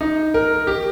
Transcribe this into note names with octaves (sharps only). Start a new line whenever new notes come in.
D#4
A#4
G4